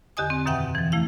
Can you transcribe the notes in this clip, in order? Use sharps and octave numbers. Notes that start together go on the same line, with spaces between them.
E2 D3 G4 D#5 G#5 D#6
C4
F#2 B2 D#3 E5 F#5 G5
E3 F3
A3 E4 F5